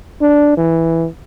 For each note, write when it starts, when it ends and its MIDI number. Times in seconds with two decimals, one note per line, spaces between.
0.22 0.54 62
0.57 1.07 52